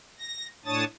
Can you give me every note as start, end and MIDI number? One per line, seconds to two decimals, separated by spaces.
0.18 0.47 94
0.65 0.84 45
0.65 0.84 62
0.65 0.84 73
0.65 0.84 81
0.65 0.84 87
0.65 0.84 93